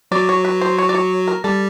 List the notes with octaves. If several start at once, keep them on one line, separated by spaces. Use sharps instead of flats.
F#3 D5
C#5
B4
C5
C#5
D5
C#5
A#4
G3 A4